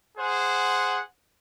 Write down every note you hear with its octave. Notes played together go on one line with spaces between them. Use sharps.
G#4 C5 F#5